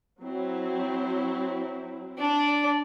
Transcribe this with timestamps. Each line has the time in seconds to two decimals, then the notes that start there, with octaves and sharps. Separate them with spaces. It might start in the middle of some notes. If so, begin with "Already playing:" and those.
0.21 F#3 C4 E4
2.18 D4 D5